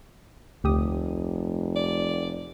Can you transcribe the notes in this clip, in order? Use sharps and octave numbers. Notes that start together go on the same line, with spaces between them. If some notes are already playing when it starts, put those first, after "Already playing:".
F1 D2 G4 D#6
D5